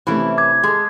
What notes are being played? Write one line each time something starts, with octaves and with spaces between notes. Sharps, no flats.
C3 E3 A3 C#4 E4
D6 G#6
G#3 G#4 A4